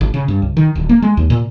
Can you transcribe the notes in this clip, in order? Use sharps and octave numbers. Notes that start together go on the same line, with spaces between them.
G#1
C#3
G2
C#2
D#3
D1
A#3
G#3
D#2
A#2